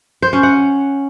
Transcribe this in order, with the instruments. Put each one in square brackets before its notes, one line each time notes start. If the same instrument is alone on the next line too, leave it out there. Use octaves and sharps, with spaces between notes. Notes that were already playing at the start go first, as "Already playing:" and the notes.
[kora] C5
C#4
F#5